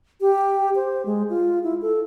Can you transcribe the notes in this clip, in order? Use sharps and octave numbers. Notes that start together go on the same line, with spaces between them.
G4
C5
G#3
F4
E4
A4